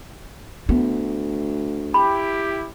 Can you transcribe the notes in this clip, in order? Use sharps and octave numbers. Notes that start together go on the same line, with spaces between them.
D2 B3
E4 G4 B5